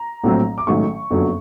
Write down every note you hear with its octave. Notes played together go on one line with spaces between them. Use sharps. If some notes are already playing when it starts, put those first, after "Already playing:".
Already playing: A#5
A#1 A2 F#3 A3 C4
D6
A1 G#2 D#3 F#3 A3 C#6
F#1 F2 D3 F#3 B3